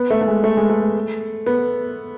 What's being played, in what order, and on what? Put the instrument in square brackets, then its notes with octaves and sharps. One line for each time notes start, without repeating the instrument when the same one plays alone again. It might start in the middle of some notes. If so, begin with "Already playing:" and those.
Already playing: [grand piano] B3
A3
A3
G#3
A3
G#3
A3
B3